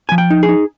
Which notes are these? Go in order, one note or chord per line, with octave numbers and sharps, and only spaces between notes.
F3 G#5
G5
D#4
G#4
D#4